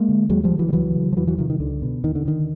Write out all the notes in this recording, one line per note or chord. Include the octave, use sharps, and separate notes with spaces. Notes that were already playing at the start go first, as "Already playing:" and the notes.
Already playing: G#3 A#3
D3
D#2 F#3 G#3
F3 G3
D3
E3 F#3
G3
C#2 E3 F#3
C#3
F3
E2 E3 F#3
E3 F#3
C3 D#3 F3
D#3
C#2 D3
B2
D#2 D#3
D3
D3 D#3